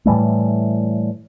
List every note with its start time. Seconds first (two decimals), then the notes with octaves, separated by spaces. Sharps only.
0.05 A2 E3 G3 A3